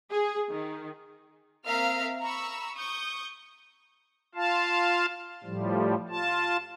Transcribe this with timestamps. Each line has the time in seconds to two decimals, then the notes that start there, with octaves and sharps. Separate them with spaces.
0.11 G#4
0.51 D#3
1.66 A#3 C4 E5 F5 A#5 F6
2.21 A#5 B5 C#6 E6
2.75 C#6 D#6 G6
4.35 F4 F5 A5
5.44 A2 F3 G3
6.09 F4 A5